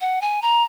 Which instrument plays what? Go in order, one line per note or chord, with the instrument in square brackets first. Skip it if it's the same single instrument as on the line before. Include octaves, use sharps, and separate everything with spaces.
[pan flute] F#5
G#5
A#5